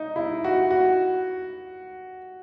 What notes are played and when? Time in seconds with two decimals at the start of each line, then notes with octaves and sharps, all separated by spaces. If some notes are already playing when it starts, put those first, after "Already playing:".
Already playing: D#4
0.16 E4
0.44 F#4
0.71 F#4